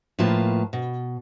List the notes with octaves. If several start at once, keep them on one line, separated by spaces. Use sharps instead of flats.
A2 F3 A#3 F4 B4 A5
B2